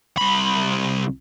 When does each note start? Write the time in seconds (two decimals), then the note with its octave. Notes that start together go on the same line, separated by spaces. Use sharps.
0.18 C2 B5